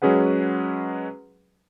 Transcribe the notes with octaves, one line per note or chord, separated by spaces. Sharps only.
F#3 G#3 C#4 G#4 B4 F#5